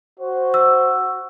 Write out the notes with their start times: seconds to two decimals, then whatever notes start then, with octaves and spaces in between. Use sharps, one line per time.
0.20 F#4 C5
0.54 E6